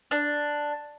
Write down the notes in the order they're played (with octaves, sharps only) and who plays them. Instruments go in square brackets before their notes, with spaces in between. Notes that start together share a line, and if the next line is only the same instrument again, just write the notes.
[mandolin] D4